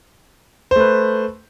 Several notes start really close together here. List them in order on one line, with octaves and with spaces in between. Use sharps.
C5 A3 B4